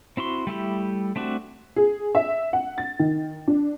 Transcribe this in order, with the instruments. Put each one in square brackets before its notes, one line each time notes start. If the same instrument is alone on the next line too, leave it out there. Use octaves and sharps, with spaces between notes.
[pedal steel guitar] C4 E4 F#4 C6
G3 A3 E4 G4
A3 C4 D4 F#4
[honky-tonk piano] G#4
E5
F#5
A6
D#3
D4